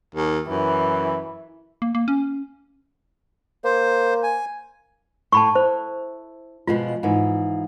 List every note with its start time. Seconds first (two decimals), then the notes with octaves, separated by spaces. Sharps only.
0.15 D#2
0.49 F#2 E3
1.82 A#3
1.95 A#3
2.08 C#4
3.64 A#3 C5
4.23 G#5
5.32 A2 A5 B5 C#6
5.55 E4 C5
6.67 B2 F3 G#3 F4
7.03 G#2 E3 F3